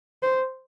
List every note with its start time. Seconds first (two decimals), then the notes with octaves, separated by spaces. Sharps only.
0.23 C5